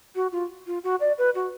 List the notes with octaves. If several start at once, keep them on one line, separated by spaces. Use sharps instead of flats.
F#4
F4
F4
F#4
D5
B4
F#4